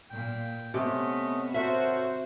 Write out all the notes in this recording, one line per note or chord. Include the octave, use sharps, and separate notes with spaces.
A#2 G5
C3 A3 B3 C#4 D#5
F#4 A4 A#4 C5 C#5 E5